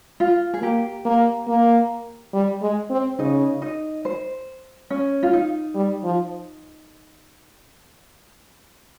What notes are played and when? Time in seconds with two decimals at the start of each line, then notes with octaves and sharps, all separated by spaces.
0.20 F4
0.54 G#4
0.62 A#3 G4
1.06 A#3
1.48 A#3
2.33 G3
2.62 G#3
2.90 C4
3.19 C#3 D#4 D#5
3.62 D#4 D#5
4.05 C5
4.90 C#4
5.23 F4
5.33 D#4
5.75 G3
6.04 F3